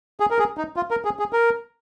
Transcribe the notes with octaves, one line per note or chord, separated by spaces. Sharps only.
G#4
A#4
G#4
D#4
F4
A#4
G#4
G#4
A#4